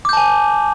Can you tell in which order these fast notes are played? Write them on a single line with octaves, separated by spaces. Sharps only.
D6 G6 A5 G#5